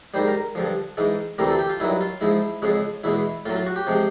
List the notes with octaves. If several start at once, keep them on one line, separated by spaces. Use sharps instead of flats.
G#2 D#3 G3 C5
A#4
G2 D3 F3
G#2 E3 G#3
D2 C3 E3 G3 A#4
A4
G4
F4
G2 D#3 F#3 E4
F4
G#2 F3 G#3 E4
F2 C#3 F3 G#3
E2 B2 G#3 E4
A2 F#3 F4
F4
F#4
G4
C3 F3 G#3